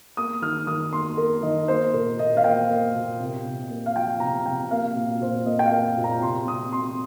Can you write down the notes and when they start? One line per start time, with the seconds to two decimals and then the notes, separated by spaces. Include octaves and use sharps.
0.17 A#3 D#6
0.42 D#3 F6
0.67 D#3 D#6
0.93 A#3 C6
1.17 A#3 A#4
1.43 D#3 D#5
1.68 A#3 C5
1.93 A#2 A#4
2.19 A#2 D#5
2.37 F5
2.44 A#3 G5
2.69 A#3
2.95 A#2
3.20 C3
3.45 C3
3.70 A#3
3.86 F5
3.95 F3 G5
4.20 C3 A#5
4.46 C3 G5
4.71 A#3 F5
4.96 A#2
5.21 A#2 C5
5.46 A#3 D#5
5.59 G5
5.66 F5
5.71 A#3
5.97 A#2
6.04 A#5
6.22 C3 C6
6.47 C3 D#6
6.72 C4 C6